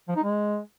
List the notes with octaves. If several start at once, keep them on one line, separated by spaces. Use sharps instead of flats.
F3
D#4
G#3